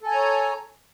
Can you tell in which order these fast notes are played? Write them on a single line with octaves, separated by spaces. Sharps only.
A4 G#5 A#5 C#5